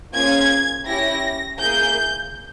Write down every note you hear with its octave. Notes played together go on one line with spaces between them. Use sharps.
A#3 C#4 F4 G#4 G#6
C#4 E4 G4 A#6
A#3 E4 G#4 G6